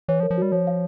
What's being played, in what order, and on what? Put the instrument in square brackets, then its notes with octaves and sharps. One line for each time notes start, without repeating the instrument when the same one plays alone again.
[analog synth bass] E3 [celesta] C#5
[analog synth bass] F3
[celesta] A#4
[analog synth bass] F3
[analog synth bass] G3 [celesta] F#4
[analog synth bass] F3 [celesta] C#5
[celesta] F5